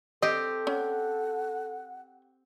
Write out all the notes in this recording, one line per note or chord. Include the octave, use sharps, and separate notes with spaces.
C4 G4 A4 D#5
C#4 F#5